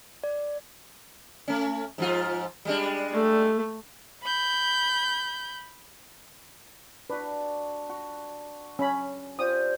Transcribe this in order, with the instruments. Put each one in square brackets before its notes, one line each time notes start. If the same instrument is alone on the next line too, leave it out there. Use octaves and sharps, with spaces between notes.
[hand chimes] D5
[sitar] A3 C#4
G#2 F3 F4
G3 G#3 D4
[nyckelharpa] A3
[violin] B5 G6
[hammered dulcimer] D4 F#4 [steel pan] B4
[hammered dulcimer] F#4
[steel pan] C#4 B5
[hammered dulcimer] F4 G4 D5 [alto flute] C5 [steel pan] D#6